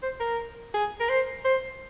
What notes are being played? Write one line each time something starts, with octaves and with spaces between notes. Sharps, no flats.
C5
A#4
G#4
A#4
C5
C5